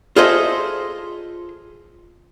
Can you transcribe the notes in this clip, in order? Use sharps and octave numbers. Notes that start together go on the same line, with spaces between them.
F4 G#4 A4 C5 D#5 E5